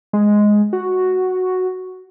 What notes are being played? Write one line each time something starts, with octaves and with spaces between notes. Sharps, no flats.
G#3
F#4